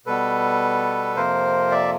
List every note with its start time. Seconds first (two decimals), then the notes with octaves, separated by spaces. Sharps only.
0.06 B2 G3 B3 A4 B4
1.16 F2 C3 F3 A#3 A#4 C5
1.71 D5 E5